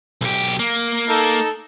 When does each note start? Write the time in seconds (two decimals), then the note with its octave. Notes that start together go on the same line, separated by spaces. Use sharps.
0.21 B1 G4
0.59 A#3
1.09 D#4 A4